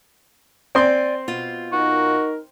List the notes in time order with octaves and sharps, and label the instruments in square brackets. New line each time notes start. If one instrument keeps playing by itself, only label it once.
[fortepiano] C4 C6 [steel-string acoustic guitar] D5 G#5
[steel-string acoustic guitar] B2 F4
[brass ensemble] D#4 A#4 [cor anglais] F#4